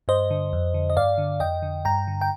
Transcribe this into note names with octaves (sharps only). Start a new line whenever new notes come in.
G2 C5 D#5
D3
F2
D3
D#5
G2 D5 F5
D3
F2 D#5 G5
D3
G2 G5 A#5
D3
G5